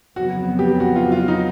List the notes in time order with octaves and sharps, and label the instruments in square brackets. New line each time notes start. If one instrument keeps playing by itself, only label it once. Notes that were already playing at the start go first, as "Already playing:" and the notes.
[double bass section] F2 C#3 F#3 B3 [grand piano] F#4
[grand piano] G4
F#4
F4
F4
D#4